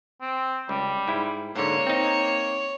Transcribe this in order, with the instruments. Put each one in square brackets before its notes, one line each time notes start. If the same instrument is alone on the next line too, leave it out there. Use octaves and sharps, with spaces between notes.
[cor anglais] C4
[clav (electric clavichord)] C#2 [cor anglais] G3
[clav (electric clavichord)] G#2 E4
[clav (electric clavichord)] G#2 D3 [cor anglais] A#3 [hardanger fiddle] C#5
[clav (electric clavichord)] C4 D#4